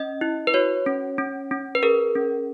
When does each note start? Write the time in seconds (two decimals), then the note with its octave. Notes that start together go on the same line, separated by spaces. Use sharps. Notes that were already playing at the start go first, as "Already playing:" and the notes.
Already playing: C#4 D#5
0.21 E4
0.47 B4
0.54 F#4 C#5
0.86 C#4
1.18 C#4
1.51 C#4
1.75 B4
1.83 G#4 A#4
2.15 C#4